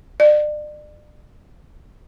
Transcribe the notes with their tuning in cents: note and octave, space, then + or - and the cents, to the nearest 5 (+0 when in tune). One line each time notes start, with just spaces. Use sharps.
D5 +35